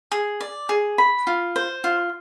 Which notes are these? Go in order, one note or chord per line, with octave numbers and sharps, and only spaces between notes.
G#4
D5
G#4
B5
F4
C5
F4